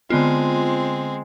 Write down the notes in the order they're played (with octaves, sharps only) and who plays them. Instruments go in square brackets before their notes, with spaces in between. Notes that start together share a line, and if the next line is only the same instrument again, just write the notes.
[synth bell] D3 B3 F4 [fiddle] G#3 C4